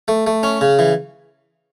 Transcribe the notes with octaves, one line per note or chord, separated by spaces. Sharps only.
A3
A3
C#4
C#3
E3